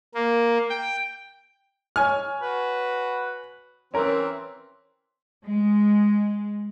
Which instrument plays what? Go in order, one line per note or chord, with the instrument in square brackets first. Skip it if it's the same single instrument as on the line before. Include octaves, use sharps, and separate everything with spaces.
[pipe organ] A#3
G5
[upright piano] C#5 G#5 F6
[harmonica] F#4 B4
[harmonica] E3 C4 [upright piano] C#4 A#4
[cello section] G#3